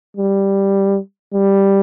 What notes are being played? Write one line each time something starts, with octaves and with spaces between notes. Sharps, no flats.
G3
G3